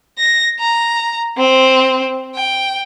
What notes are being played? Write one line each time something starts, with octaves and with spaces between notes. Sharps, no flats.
A#6
A#5
C4
G5